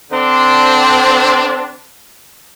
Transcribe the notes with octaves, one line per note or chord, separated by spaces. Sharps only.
D3 C4 D4